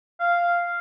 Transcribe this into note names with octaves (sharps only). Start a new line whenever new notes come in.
F5